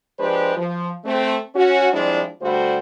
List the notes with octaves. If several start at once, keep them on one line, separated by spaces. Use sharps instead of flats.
F3 G#3 D4 G4 B4 C5
F3
A3 C4
C#4 F#4
F3 G3 G#3 C4 D4 E4
D3 G3 A3 F#4 A4 C5